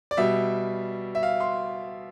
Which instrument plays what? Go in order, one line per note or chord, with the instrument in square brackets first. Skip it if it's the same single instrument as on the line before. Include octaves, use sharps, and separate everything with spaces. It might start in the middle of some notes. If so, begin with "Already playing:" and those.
[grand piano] D5
B2 G3 E5
E5
F5
C6